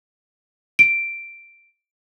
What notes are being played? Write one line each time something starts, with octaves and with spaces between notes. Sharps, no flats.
D7